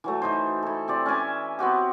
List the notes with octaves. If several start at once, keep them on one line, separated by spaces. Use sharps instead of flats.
E3 F#3 A3
E3 D#4 C5
E4 A4
C4 G4 D5
C#4 E5 G#5 D6
B3 C4 F#4 G4